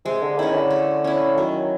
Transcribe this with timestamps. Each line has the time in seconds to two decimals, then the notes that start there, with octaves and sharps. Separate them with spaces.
0.05 C3 G#3
0.22 D3
0.38 D#3 C#4 E4
0.55 D3
0.71 A3
1.04 C#4 E4
1.37 D#3 F#3